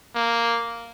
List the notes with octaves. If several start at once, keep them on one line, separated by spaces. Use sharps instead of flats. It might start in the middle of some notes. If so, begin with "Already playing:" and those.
A#3